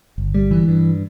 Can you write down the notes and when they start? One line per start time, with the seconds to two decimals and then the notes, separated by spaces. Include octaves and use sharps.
0.18 G1
0.34 G3
0.51 E3
0.68 G2